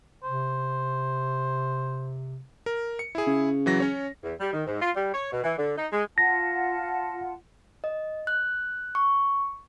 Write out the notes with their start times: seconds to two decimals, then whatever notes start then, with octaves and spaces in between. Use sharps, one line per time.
0.24 C3 C5
2.66 A#4
2.99 C#7
3.15 E4 G#4
3.27 C#3
3.66 E3 F#3 A#6
3.80 C#4 C#5
4.24 E2
4.40 G3
4.53 D#3
4.66 G#2
4.81 F4
4.96 G3
5.14 C#5
5.32 B2
5.44 E3
5.58 D3
5.77 D#4
5.92 G#3
6.18 F4 F#5 A5 A#6
7.84 D#5
8.27 F#6
8.95 C#6